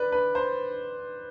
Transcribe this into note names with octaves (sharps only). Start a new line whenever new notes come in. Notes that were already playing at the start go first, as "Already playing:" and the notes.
Already playing: B4 D5
B4
C5